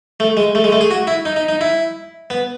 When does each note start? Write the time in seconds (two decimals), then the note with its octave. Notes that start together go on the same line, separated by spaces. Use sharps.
0.20 A3
0.37 G#3
0.55 A3
0.64 G#3
0.72 A3
0.81 G#4
0.91 F#4
1.07 E4
1.25 D#4
1.36 D#4
1.49 D#4
1.61 E4
2.30 B3